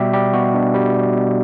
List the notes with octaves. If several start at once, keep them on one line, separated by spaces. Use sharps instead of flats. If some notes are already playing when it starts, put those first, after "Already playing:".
Already playing: B2 G3 G4 E5
G3 G4
B2 F#4
B2 D4
G3
G3
B2